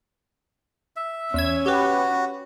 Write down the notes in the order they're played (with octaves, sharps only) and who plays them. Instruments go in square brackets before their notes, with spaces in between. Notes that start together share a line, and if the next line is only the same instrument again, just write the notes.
[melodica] E5
[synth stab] E2 E6 G#6 [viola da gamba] C#4
[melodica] F#4 [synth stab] G4 B4